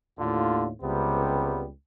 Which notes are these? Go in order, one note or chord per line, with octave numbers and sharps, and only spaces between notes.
D#2 A2 D3 F4
C#2 C3 G3 B3